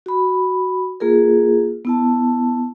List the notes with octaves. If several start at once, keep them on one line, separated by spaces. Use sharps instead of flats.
F#4 B5
A#3 F4 G#4 A#4
B3 E4 A5